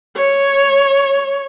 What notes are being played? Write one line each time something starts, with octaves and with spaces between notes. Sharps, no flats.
C#5